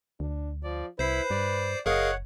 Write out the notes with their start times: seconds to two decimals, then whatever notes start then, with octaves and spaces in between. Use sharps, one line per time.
0.20 D2 D4
0.63 F3 D5
0.99 C2 E4 B4 C5 B5 C7
1.30 G2 D5
1.86 F#1 G#4 A#4 C#5 D#5 F5 F#5